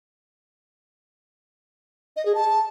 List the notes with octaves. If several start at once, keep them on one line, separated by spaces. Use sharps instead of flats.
D#5
G#4
A5